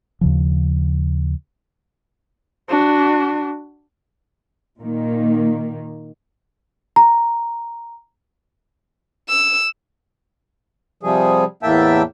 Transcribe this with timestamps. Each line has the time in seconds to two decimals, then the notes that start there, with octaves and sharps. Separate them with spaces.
0.21 D#2 C#3 F3
2.69 D4 F#4
4.78 A#2 D#3 A#3
6.96 A#5
9.29 E6
11.03 C3 F3 G3 G#4
11.63 E2 A2 A#3 E5 G5 A5